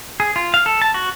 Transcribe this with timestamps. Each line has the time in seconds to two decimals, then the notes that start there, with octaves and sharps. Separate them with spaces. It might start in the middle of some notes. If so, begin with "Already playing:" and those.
0.20 G#4
0.36 F4
0.54 F5
0.66 A4
0.82 A5
0.94 F#4